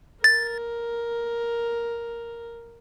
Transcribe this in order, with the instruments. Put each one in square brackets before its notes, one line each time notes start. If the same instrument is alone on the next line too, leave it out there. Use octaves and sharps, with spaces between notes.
[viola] A#4 [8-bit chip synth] A6